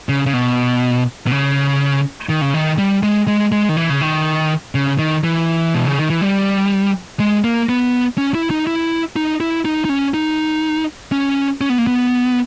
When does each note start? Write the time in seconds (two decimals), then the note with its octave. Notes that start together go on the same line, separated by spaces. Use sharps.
0.09 C#3
0.26 C#3
0.33 B2
1.27 B2
1.32 C#3
2.29 D#3
2.42 C#3
2.54 D#3
2.78 G3
3.03 G#3
3.28 G#3
3.52 G#3
3.69 D#3
3.77 E3
3.90 C#3
4.01 D#3
4.75 C#3
4.99 D#3
5.24 E3
5.74 B2
5.86 C#3
5.98 D#3
6.10 E3
6.22 G3
7.20 G#3
7.44 A#3
7.69 B3
8.18 C#4
8.35 E4
8.51 D#4
8.67 E4
9.16 D#4
9.40 E4
9.65 D#4
9.85 D#4
9.89 C#4
10.14 D#4
11.12 C#4
11.61 C#4
11.70 B3
11.78 A#3
11.87 B3